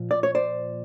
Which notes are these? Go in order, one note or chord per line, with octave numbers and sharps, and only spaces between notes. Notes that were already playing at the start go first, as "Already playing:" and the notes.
Already playing: A#2 F3
D5
C#5
C5 D5